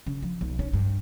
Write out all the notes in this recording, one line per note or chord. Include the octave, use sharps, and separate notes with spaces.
C#3
F3
B1
C#4
G2